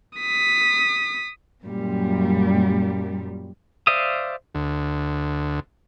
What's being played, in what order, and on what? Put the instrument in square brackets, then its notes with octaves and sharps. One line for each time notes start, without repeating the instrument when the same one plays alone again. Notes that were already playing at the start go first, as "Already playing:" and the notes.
[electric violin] D#6 B6
[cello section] F#2 A#2 G3
[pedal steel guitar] C5 D5 E5 F5 D#6
[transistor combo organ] D2